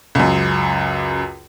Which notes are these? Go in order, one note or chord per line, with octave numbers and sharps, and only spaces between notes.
C#2 F#2